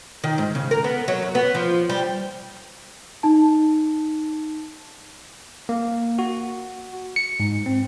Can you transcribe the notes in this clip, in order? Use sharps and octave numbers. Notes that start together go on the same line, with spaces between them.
D#3
G#2
C#3
A#4
B3
F#3
F#2
B3
F3
G3
D#4 A5
A#3
F#4
C#7
G#2
C4